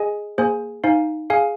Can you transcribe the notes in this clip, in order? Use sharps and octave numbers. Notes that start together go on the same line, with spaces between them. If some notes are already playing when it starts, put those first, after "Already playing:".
Already playing: G#4 D#5 G#5
A#3 G#4 C5 G#5
D#4 C5 F5 G#5
G#4 F5 G#5